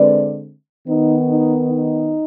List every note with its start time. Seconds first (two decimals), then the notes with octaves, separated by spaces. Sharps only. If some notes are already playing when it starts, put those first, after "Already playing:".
Already playing: D3 G#3 C4 B4 D5
0.87 D#3 B3 D#4
1.28 D#4
1.68 D#4